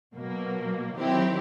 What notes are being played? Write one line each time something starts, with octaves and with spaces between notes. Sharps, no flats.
B2 F#3 A#3
D#3 F#3 C4 E4 G4